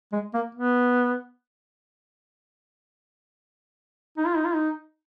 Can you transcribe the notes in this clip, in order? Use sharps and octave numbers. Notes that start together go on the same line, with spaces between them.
G#3
A#3
B3
D#4
F4
D#4
F4
D#4